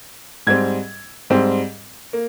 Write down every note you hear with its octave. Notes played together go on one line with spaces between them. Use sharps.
G#2 G3 C4 G#6
G#2 G3 C4
A#3